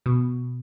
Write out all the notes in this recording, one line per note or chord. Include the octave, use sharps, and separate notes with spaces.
B2